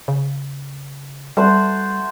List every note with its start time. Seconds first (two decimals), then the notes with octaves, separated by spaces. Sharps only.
0.08 C#3
1.37 G3 A3 C5 F#5